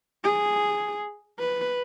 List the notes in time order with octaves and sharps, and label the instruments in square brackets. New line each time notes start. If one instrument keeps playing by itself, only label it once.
[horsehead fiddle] G#4
B4